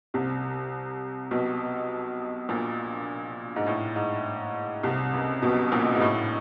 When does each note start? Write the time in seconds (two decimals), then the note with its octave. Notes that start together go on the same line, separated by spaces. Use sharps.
0.14 C2 C3
1.31 B1 B2
2.49 A#1 A#2
3.56 G#2
3.67 A2
3.96 G#2
4.83 C2 C3
5.13 C#2 C#3
5.42 B1 B2
5.72 A#1 A#2
5.95 G#2
6.01 A2